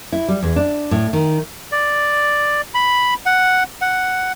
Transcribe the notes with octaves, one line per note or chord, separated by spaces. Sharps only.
E4
G3
E2
D4
A2
D#3
D5
B5
F#5
F#5